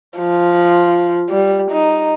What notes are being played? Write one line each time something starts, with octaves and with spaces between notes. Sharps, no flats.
F3
G3
D#4